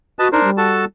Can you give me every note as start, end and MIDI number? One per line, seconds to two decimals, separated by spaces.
0.19 0.32 66
0.19 0.28 71
0.19 0.28 75
0.19 0.28 81
0.32 0.50 62
0.32 0.43 63
0.32 0.50 70
0.32 0.50 72
0.44 0.84 55
0.57 0.85 66
0.57 0.85 69
0.57 0.85 81